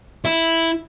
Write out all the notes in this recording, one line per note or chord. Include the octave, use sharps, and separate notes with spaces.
E4